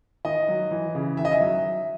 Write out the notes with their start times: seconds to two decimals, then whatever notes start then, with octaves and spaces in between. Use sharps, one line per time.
0.25 D#3 D#5
0.48 F#3
0.71 E3
0.95 C#3
1.17 D#3 E5
1.25 D#5
1.32 E5
1.41 F#3